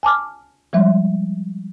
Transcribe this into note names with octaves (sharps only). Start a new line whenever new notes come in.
G#5 A5 D6 F6
F3 G3 G#3 E5